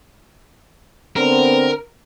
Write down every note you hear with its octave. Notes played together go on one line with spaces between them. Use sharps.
D3 B3 C4 A#4